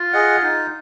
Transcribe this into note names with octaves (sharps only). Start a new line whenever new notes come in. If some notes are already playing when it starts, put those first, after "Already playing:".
Already playing: F4
G#4 D#5 F#5
D#4